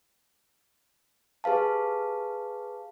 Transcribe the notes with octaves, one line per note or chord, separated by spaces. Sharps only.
G4 G#4 B4 F5 A5